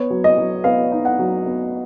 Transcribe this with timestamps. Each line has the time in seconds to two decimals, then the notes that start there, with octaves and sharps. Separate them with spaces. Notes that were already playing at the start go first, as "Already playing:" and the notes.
Already playing: B3 C#5
0.10 F#3
0.24 D#5
0.38 F#3
0.64 B3 F5
0.92 D#4
1.05 F#5
1.19 F#3
1.46 B3